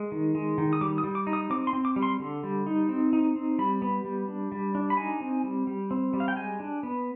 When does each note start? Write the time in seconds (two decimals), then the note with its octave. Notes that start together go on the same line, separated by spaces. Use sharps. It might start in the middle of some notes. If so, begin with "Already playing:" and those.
Already playing: G#3
0.12 D#3
0.35 G#3
0.58 D#3
0.73 D#6
0.81 G3 D6
0.98 D#6
1.04 G3
1.15 D6
1.27 D#4
1.33 D#6
1.50 C4 D6
1.67 C6
1.73 C4
1.85 D6
1.96 G3
2.03 C6
2.20 D3
2.43 G3
2.66 D#4
2.89 C4
3.13 D#4
3.36 C4
3.59 G3 B5
3.82 B3
4.05 G3
4.28 D4
4.52 G3
4.75 D4
4.90 B5
4.97 D#4 G#5
5.20 C4
5.44 G3
5.67 G3
5.91 C4
6.14 G3
6.20 F5
6.28 G5
6.36 G#3 G#5
6.60 D4
6.83 B3